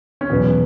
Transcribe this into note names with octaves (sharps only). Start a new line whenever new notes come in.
C#4
E2 B2 F#3 B3